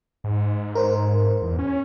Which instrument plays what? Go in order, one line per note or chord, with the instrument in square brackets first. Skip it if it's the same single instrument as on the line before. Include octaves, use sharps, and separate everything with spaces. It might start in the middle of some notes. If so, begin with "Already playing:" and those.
[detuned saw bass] G#2
[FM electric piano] A#4 C5
[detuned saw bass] E2
C#4